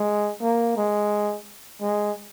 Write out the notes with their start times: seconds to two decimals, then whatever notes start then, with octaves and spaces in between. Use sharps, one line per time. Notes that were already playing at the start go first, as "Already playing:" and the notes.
Already playing: G#3
0.41 A#3
0.77 G#3
1.82 G#3